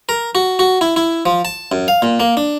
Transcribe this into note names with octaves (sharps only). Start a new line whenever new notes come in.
A#4
F#4
F#4
E4
E4
F3
A5
F#2
F5
A#2
A#3
D4